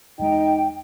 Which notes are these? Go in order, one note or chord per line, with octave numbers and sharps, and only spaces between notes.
E2 G#3 D#4 G5